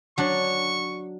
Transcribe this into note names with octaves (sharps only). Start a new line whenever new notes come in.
F#3 D4 C#6